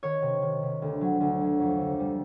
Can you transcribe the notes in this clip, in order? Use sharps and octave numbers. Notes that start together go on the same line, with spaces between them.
D#3 C#5
C3
D#3
C3
D2
F#3
D2
F#3
F2
D3
G3